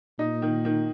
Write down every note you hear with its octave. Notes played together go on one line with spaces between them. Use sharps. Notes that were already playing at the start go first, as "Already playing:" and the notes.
A#2 D#4
D#3
D#3